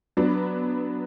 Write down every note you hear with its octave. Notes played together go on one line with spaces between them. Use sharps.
F#3 B3 D4